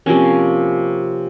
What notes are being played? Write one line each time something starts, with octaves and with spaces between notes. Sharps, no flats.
C3 F3 A#3 C#4